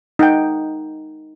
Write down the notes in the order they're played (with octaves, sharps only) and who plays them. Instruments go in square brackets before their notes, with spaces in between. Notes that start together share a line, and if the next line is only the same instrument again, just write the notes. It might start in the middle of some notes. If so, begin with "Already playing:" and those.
[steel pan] D#4 F#5 G5